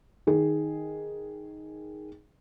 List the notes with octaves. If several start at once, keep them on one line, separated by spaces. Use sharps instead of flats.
D#3 G#4